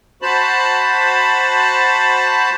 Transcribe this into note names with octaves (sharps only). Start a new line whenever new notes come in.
F#4 C5 A5 B5